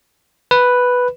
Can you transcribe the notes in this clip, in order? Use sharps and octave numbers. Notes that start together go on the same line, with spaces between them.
B4